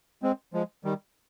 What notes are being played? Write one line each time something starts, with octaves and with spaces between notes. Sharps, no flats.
G#3 C4
F3 G#3
D#3 G3